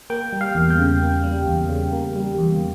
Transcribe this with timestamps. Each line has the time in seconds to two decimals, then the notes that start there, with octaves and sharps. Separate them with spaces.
0.10 A#3 G5
0.33 G3
0.41 F5
0.55 E2
0.70 G5
0.79 C#3
1.01 A#3
1.24 G3
1.47 E2
1.69 C#3
1.92 A#3
2.16 G3
2.38 E2